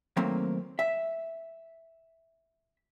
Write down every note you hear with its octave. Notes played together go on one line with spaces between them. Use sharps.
D#3 F#3 A3 A#3 C4
E5